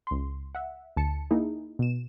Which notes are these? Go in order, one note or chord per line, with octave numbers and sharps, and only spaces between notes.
C#2 C6
E5 F#5
D2 A5 C#7
A#3 D#4 E4 G#4
B2 E7